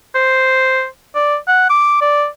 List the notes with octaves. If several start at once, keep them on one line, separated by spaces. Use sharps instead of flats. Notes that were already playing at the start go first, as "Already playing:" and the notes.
C5
D5
F#5
D6
D5